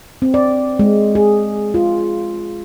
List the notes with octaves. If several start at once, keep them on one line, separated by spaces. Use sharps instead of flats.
C4
D5
G#3
G#4
F4